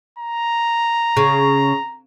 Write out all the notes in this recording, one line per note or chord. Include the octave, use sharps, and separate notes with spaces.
A#5
C#3